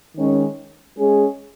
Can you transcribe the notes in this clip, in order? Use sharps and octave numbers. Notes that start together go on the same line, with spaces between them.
D#3 G#3 C#4
G#3 C#4 G#4